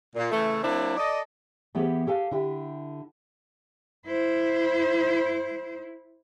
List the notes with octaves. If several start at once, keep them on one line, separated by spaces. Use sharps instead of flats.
A#2
C#3 E3 A3
F#3 A#3 C4 D4 E4
A4 D5 D#5
E3 B3 G4 G#4 C5
G4 A4 F5 G#5
D3 E4 G4
E4 C5